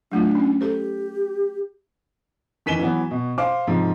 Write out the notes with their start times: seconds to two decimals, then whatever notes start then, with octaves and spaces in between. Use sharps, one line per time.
0.12 F#3 A3 D4 F4
0.35 C#4
0.61 G4 A4 C5
2.66 D#3 E3 B6 D#7 E7 G7
2.79 E3 F#3 B3
3.11 B2
3.38 C5 F5 D6
3.67 G#2 C3 F3